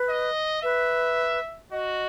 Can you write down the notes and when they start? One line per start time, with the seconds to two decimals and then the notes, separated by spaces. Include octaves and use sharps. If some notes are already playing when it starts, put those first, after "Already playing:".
Already playing: B4
0.09 D#5
0.63 B4 E5
1.72 F#4 D#5